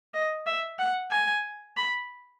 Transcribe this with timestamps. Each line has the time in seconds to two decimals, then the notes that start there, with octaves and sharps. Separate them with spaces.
0.14 D#5
0.46 E5
0.79 F#5
1.11 G#5
1.77 B5